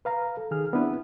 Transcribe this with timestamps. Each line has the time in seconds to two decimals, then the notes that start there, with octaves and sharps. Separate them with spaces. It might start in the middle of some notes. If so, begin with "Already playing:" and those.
0.05 B4 F5 A#5
0.37 A4
0.51 D#3 G#4 F6
0.73 B3 C4 D4 E4 B4